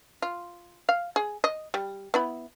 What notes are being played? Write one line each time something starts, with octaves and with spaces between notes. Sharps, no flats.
F4
F5
G#4
D#5
G3
B3 E4 B5